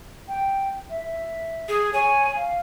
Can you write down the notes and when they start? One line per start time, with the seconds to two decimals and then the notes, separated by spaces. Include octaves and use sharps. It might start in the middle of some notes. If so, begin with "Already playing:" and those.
0.28 G5
0.90 E5
1.04 E5
1.69 G#4
1.93 C#5 G#5
2.36 F5